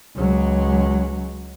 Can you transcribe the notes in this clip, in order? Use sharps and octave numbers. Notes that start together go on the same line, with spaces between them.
C#2 F#3